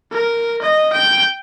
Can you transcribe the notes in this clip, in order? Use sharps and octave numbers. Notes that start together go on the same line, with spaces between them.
A#4
D#5
G5